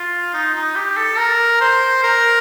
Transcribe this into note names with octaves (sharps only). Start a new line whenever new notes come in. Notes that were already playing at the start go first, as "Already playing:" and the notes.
Already playing: F4
D#4
D#4
G4
A4
A#4
C5
A#4